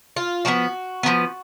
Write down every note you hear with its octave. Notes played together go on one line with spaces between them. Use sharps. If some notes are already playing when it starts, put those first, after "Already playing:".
F4
F3 G#3 B3 F#4
F3 G#3 B3